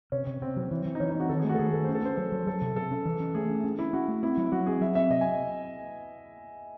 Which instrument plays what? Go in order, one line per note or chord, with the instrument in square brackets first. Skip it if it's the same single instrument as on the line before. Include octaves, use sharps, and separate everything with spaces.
[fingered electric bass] C3 [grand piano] C#4
[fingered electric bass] C3
[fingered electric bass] C3 [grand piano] C4
[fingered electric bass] F#3
E3
E3
[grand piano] D#4
[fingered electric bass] E3 [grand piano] C#4
[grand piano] D#4
[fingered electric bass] C4 [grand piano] F#4
[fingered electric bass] D#3 [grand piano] A4
[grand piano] G#4
[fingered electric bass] A3
[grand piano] F#4
A4
[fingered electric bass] D#3 [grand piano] G#4
[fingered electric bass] A3 [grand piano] A4
[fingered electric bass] C#4 [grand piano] C5
[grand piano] A4
[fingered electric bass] C#4 [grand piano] C5
[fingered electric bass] F#3 [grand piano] A4
[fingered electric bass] F#3
[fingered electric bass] F#3 [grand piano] A4
[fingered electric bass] C3
[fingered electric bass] C3 [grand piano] A4
[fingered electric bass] C#4
E3
C#4
[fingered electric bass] A3 [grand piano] G#4
[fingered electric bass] C#4
C#4
[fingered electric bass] C#4 [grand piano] E4
[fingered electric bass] C#4 [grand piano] F#4
[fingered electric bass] A3
[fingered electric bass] C4 [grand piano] E4
[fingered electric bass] F#3
[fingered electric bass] F#3 [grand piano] F#4
[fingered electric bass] C4 [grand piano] G#4
[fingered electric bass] F#3 [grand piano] E5
[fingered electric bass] C4 [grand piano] E5
[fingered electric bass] C3 [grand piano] D#5
[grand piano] G#5